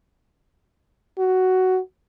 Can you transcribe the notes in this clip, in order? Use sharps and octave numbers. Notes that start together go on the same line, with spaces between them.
F#4